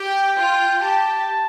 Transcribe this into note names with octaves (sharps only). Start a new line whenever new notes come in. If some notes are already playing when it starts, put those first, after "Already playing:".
Already playing: G4 G5
F4
G4 A5